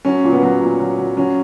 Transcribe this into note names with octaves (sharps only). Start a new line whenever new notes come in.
F#3 C#4
A#2
B3
F#3
A#2
F#3
F#3
F#3 C#4